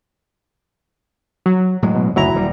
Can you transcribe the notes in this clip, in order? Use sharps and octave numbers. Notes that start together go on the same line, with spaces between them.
F#3
A2 F#3 G#3
B2
F#1 D2 F#3 E4 A#5
D#1 G3